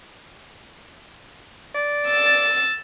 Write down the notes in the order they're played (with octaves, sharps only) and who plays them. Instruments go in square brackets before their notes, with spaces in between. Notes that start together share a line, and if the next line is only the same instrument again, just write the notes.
[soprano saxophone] D5
[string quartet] E6 A6